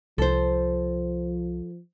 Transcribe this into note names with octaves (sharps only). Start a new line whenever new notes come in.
C2 F3 A4 C5